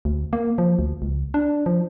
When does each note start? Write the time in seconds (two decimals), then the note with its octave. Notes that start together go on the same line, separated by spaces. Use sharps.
0.05 D2
0.33 A#3
0.58 F3
0.79 D2
1.02 C#2
1.34 D4
1.66 F3